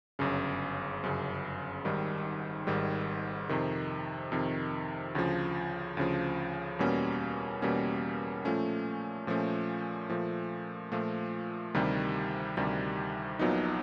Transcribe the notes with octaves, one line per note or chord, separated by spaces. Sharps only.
G1 F#2 C#3
G1 F#2 C#3
G#1 G#2 D#3 G3
G#1 G#2 D#3 G3
F2 C3 D#3
F2 C3 D#3
D2 C#3 F3
D2 C#3 F3
E2 B2 G3 A#3 C#4
E2 B2 G3 A#3 C#4
A#2 F3 A3 C#4
A#2 F3 A3 C#4
A#2 F3 A3
A#2 F3 A3
D2 C3 D#3 G3
D2 C3 D#3 G3
A#1 A#2 F#3 B3 D#4